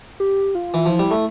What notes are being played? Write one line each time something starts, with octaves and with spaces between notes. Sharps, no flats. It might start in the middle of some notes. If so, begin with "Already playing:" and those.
G4
F4
E3
F3 E4
G3
A3